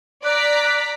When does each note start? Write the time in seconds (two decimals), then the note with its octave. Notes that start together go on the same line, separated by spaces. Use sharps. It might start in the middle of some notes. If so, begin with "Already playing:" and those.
0.24 D5 A#5 F#6 B6